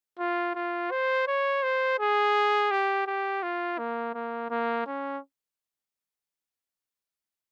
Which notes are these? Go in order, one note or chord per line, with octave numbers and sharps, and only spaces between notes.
F4
F4
C5
C#5
C5
G#4
G4
G4
F4
A#3
A#3
A#3
C#4